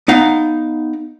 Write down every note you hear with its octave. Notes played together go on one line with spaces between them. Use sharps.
B3 D#4 F5 A#5